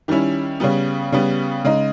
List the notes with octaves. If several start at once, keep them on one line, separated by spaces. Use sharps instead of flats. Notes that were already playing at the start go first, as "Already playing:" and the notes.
D#3 G3 C#4 E4
C#3 G3 B3
C#3 G3 B3
C#3 G#3 D#4